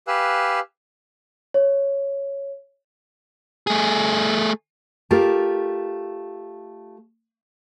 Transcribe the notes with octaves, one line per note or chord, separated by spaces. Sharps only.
G4 B4 F5 G#5 E6 F#6
C#5
A3 G#4
A3 F4 G4 A#4